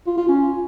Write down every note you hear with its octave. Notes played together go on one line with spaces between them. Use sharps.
F4
F4
C#4